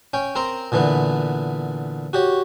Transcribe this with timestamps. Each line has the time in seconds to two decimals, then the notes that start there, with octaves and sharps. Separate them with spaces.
0.13 C#4 G5
0.35 C4 A#4 A#5 C6
0.72 A#2 D3 E3 B3
2.13 F#4 G4 C#5